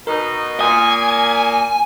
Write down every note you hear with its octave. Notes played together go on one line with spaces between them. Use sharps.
B2 D#4 A#4
A#2 G#5 D#6